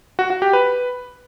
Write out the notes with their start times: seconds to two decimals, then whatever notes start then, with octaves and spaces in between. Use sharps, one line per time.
0.19 F#4
0.30 F#4
0.42 G4
0.53 B4